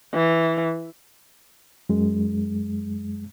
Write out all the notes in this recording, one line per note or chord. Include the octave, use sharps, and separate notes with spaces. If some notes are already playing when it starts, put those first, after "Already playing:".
E3
F#2 G#3